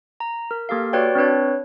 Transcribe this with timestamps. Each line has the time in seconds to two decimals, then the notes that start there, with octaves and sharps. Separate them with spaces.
0.20 A#5
0.51 A#4
0.69 A#3 G4 A4 F5
0.93 F#4 B4 C#5 D5 G5
1.15 C4 D4 B4 C#5